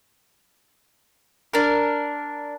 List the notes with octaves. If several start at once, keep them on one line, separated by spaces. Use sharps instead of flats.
D4 A#4